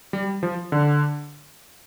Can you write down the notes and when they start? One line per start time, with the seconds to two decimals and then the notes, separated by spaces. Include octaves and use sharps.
0.13 G3
0.43 F3
0.72 D3